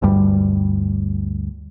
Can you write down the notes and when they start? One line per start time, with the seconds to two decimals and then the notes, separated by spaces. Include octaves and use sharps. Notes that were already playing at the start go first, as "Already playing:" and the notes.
0.02 G1 D2 G2 G3